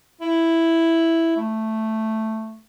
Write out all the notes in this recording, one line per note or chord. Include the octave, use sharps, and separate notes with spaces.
E4
A3